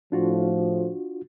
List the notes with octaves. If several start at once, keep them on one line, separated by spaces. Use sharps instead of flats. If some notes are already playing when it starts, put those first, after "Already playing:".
A2 F3 D4 F4 F#4